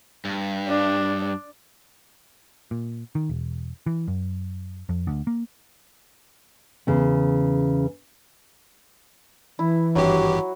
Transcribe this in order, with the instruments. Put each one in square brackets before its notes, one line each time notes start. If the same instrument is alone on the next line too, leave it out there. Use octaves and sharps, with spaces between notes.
[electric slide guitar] G2
[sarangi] D4
[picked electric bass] A#2
D#3
E1
E3
F#2
F2
D2
A#3
[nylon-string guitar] E2 C#3
[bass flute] E3 [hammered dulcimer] E4
[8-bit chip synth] G#1 G2 G4 [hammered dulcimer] F#3